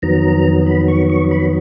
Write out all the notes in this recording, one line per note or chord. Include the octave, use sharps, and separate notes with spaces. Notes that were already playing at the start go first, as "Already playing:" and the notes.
F2 D#3 F#3 B3 A#5
B5
C#6
C#6
B5